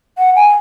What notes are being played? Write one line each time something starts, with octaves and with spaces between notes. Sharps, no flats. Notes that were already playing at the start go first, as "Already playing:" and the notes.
F#5
G#5